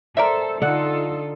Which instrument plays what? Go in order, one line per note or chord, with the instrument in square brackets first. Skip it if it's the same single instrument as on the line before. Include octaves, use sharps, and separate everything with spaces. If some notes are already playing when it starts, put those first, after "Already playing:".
[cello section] A4 C5 [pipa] A#4 D5 E5
[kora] D3 F#5 [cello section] D#4 F4 A4